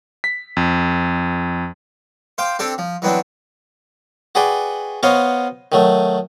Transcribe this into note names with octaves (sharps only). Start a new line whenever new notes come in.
B6
F2
C5 F5 G5 D6
C4 D4 G4 A4 D5
F3
E3 F#3 B3 C4 D4
F#4 G#4 B4 D5 G5
B3 F#4 C5 C#5 D#5 F5
D#3 F#3 A3